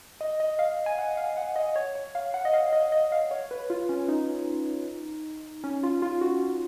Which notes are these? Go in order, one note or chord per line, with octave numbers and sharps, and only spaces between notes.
D#5
D#5
F5
G#5
F#5
F5
F#5
D#5
C#5
C#5
F5
F#5
D#5
F5
D#5
D#5
F5
C#5
B4
F4
C#4
D#4
C#4
F4
F4
F#4